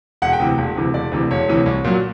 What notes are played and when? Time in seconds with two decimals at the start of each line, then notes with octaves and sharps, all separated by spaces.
0.22 E1 F#5
0.33 G5
0.39 D2 C3 E3
0.58 E1
0.76 D2 C3 E3
0.94 E1 D5
1.11 D2 C3 E3
1.31 E1 C#5
1.48 D2 C3 E3
1.66 C2
1.84 A#2 F#3